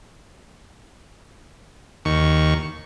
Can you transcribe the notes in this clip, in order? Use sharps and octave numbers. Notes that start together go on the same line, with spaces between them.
D#2 C#6